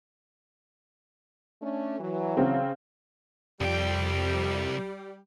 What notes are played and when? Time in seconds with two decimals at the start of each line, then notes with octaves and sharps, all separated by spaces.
1.62 A3 C#4 D4
2.00 E3 F#3
2.37 C#3 C4
3.61 C2 F2 G3 G5